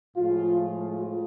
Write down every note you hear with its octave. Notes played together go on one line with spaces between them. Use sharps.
A2 F3 G#3 F4
F4